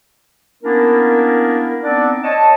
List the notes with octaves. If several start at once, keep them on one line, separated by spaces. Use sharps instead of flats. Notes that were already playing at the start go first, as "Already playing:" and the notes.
A#3 B3 C#4 D4 E4 A#4
B3 C4 D4 D#4 D5
C#5 D#5 A5